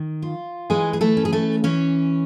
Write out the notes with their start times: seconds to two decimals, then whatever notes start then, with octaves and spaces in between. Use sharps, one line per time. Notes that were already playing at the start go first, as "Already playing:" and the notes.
Already playing: D#3
0.22 F4
0.70 E3 G#3 G#4
0.93 G#4
1.01 A3 A4
1.17 C#4
1.25 G#4
1.33 A3 A4
1.64 E3 C#4 C#5